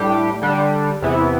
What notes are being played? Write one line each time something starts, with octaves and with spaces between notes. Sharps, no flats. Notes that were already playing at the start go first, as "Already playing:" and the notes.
Already playing: A2 G3 D4 G4
D3 G3 D4
E2 C3 E3 B3 E4